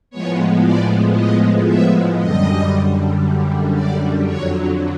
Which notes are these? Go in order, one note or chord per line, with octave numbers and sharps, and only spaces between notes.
A2 F3 G#3 B3 C#5
D5
D#5
E5
F#2 D3 G3 D#5
D5
F2 D3 F#3 C#5